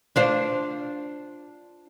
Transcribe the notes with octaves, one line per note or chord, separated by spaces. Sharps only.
D4 F4 C5